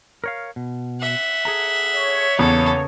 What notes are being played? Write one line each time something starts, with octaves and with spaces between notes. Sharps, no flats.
A#4 C#5 F5
B2
E5 F#5
G#4 A4 A#5
C#5
E2 C#3 A#3 B3 A4